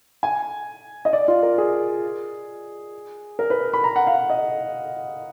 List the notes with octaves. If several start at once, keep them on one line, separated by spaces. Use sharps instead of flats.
G#5
D#5
D5
F4
A#4
G#4
A#4
B4
B5
A#5
F#5
F5
D#5